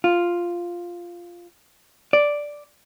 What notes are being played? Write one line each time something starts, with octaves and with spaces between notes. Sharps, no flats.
F4
D5